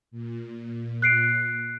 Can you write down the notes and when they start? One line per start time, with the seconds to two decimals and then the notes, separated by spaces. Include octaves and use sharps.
0.11 A#2
1.02 F#6 C7 D7